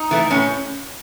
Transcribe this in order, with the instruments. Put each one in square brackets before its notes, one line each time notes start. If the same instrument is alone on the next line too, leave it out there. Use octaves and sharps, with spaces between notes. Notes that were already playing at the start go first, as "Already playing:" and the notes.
Already playing: [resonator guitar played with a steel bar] D#4
E3 A3
A2 C#4